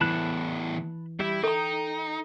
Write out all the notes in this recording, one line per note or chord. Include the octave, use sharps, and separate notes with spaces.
E2 A2 E3 A5 B5 F#6
G3 E4 G4 E5
D#4 A4 G5 A#5